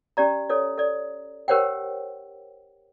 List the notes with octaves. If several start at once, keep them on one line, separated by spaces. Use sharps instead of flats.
C#4 G4 D5 A#5
A4 C#5 D5
A4 D5
G4 A#4 C5 C#5 F#5 G5